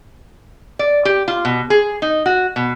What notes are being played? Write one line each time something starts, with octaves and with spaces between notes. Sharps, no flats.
D5
G4
F4
B2
G#4
D#4
F#4
B2